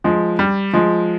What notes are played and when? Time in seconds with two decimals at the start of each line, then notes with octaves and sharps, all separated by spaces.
0.04 F3 G#3
0.39 G3
0.73 F3 G#3